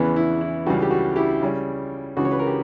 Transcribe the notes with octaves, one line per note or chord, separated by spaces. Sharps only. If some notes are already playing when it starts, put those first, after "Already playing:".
Already playing: E2 C#3 E3 B3
E4
E4
C#2 C#3 E3 G3 F#4
G4
F#4
E4 G4
C#3 G3 C#4
C#2 C#3 E3 F#4
C#5
B4
A#4
G4